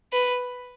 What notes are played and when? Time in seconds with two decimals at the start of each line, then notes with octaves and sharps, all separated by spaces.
0.13 B4